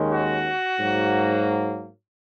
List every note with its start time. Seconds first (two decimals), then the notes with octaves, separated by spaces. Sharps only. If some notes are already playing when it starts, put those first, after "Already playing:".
Already playing: D#2 D#3 G#3 C#4
0.10 F#4
0.79 G#2 F#3 A#3